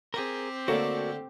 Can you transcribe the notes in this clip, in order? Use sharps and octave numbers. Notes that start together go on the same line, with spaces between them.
C4 G4 G#4 A#4
D3 A3 A#3 F#4 A4 C#5 D5